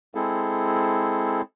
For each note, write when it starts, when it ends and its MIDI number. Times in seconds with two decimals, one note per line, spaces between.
0.15 1.41 56
0.15 1.41 60
0.15 1.41 64
0.15 1.41 68
0.15 1.41 69